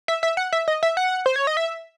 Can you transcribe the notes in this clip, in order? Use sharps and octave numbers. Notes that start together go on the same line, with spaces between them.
E5
E5
F#5
E5
D#5
E5
F#5
C5
C#5
D#5
E5